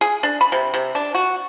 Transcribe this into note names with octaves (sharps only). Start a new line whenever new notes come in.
G#4
D4
B5
C3
C3
D4
F#4